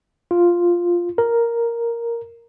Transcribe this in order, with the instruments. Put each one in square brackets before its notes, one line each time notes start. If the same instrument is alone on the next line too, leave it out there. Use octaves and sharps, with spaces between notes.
[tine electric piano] F4
A#4